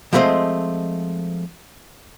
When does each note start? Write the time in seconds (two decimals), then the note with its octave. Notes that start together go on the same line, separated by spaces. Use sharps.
0.13 F3 G#3 A3 C4 C5 D#5